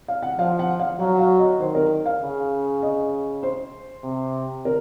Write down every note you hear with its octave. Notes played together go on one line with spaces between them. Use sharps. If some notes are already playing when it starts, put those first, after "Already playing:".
F5
F#5
F3 F5
F#5
F5
F#3 F5
F5
D#5
D#3 C5
A#4
F5
C#3
D#5
C5
C3
A#4